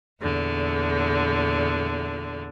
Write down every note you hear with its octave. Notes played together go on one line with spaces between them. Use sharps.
E2 A#2 D3